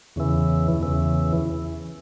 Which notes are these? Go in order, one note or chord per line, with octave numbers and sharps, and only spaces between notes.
E2 C#3 E3
E2 C#3 E3